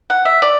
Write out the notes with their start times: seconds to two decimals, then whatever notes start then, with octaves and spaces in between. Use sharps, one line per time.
0.10 F#5
0.25 E5
0.42 D5